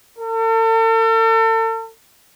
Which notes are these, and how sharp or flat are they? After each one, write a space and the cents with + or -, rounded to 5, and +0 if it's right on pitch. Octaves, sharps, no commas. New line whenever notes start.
A4 +40